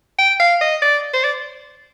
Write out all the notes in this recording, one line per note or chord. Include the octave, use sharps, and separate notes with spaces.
G5
F5
D#5
D5
C5
D5